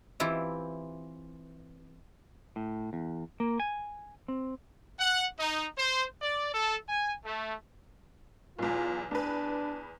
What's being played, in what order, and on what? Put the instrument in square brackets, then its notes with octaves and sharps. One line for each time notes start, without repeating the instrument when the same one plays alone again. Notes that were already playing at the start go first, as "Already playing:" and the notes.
[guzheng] E3 C4 E4 F4 G4
[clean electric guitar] A2
E2
A#3
G#5
C4
[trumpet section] F#5
D#4
C5
D5
A4
G#5
A3
[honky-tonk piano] B1 E2 [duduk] F4
[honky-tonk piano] E2 B4 [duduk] D4